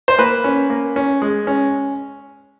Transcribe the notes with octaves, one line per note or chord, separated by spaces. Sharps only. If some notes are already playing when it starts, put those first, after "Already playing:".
C5
A#3 B4
C#4
A#3
C#4
G#3
C#4